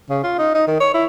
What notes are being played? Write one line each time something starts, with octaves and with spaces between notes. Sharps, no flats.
C#3
F4
D#4
D#4
D#3
C#5
E4